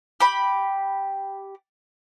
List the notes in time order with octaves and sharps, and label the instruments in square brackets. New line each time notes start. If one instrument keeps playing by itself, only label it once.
[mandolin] G4 B5